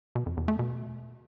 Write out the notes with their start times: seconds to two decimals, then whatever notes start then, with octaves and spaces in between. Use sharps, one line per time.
0.15 B2
0.26 F2
0.37 E2
0.48 A3
0.59 B2